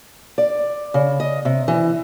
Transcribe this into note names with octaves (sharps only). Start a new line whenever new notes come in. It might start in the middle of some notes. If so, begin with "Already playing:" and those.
D5
C#3
D#5
C3
E3